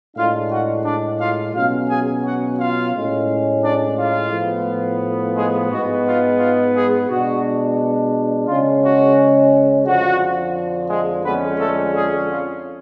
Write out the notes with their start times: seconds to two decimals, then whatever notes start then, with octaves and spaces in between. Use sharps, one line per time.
0.16 A2 G#3 D4 F4 F5
0.50 F#4 F#5
0.85 D4 D5
1.19 F4 F5
1.54 B2 F#3 C#4 F4 F5
1.89 G#4 G#5
2.23 F#4 F#5
2.59 F4 F5
2.93 A2 G#3 C#4
3.62 D4 D5
3.97 F4 F5
4.32 A2 F3 B3
5.36 G#3 G#4
5.70 G#2 G#3 B3 F#4
6.05 F4
6.39 F4
6.75 G#3 G#4
7.08 B2 G#3 D4 F#4
8.47 C#3 G#3 C#4 F4
8.83 F#4
9.86 F2 D3 F3 F#4
10.89 G#3 G#4
11.24 F2 D3 G#3 B3 C#4 B4
11.59 A3 A4
11.94 G#3 G#4
12.29 F4